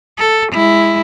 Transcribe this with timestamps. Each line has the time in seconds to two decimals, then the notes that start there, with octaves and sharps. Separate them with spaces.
0.18 A4
0.53 G#3 E4